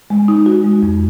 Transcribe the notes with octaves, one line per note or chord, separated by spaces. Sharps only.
G#3
D#4
F#4
G#3
F2